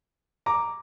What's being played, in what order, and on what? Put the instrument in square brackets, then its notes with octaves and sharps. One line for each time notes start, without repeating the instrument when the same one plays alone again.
[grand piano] A#5 D6